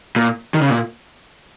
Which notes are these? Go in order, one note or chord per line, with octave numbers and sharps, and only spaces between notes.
A#2
D#3
C#3
A#2